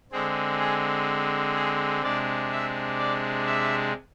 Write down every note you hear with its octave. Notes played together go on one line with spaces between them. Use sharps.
D3 G#3 C4 G#4
G#4
G#4
C3 G#3 D4 D5
E5
D5
E5